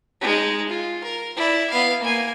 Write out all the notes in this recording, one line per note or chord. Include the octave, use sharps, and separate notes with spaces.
G#3 D#4
F4
A#4
E4 D5
B3 F5
A#3 G#5